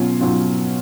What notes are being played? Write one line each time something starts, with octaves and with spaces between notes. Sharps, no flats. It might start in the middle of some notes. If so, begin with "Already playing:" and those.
Already playing: B2 F#3 C#4 F4
B2 F#3 C#4 F4